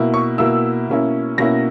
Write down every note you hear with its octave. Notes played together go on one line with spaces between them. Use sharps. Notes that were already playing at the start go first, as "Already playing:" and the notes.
Already playing: B2 A#3 E4
C#6
B2 A#3 E4 E6
B2 A#3 C#4 E4
B2 A#3 C#4 E4 A#6